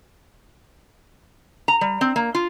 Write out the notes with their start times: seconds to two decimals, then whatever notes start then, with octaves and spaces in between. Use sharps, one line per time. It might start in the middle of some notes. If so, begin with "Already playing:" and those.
1.68 A#5
1.81 G3
2.01 C4
2.16 A#3
2.35 F4